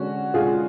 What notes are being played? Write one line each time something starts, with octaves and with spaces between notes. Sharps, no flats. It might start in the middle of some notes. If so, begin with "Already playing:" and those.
Already playing: D3 G#3 C#4 F#4
D3 G#3 F4 G#4